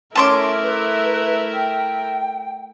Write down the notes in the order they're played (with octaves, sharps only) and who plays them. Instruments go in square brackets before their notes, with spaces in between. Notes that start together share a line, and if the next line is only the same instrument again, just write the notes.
[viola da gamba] A3 E4 A#4 [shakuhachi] C#4 [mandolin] A5 C6 D6
[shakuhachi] B4
G5